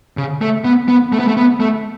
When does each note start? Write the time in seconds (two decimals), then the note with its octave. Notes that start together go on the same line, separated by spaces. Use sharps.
0.17 C#3
0.41 A3
0.64 B3
0.88 B3
1.12 A3
1.19 B3
1.28 A3
1.37 B3
1.60 A3